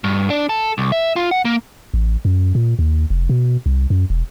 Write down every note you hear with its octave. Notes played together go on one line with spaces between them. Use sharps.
G2
D4
A4
C2
E5
F4
F#5
A#3
A1
F#2
A#2
D#2
F1
B2
C2
F#2
E1